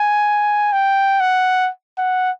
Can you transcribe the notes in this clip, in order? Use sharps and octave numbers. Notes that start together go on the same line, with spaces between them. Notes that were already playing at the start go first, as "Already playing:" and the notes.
Already playing: G#5
G5
F#5
F#5